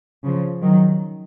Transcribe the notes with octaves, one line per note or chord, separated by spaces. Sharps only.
C#3 F3
D#3 F#3